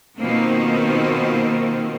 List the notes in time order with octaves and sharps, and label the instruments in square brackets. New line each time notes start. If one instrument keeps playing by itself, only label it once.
[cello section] B2 D#3 F3 A#3 C4